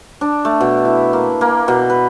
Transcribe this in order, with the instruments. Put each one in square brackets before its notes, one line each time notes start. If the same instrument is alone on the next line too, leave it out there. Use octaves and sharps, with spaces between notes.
[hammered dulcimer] D4
A3
B2
E4
A#3
A#3
B2
B4